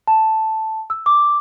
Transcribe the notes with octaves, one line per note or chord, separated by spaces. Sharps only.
A5
E6
D6